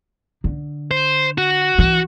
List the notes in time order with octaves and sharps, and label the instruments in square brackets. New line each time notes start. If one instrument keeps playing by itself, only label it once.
[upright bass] D3
[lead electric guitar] C5
F#4
[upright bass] E3